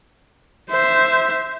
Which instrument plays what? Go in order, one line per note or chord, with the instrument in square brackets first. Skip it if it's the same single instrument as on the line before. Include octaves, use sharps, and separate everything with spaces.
[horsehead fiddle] C5 E5